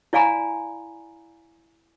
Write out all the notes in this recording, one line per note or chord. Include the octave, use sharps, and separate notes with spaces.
E4 D5 F5 G#5 A#5 B5